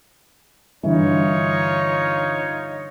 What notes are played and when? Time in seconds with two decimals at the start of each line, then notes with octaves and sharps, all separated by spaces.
0.83 G2 D3 E3 D#4 F4 C#5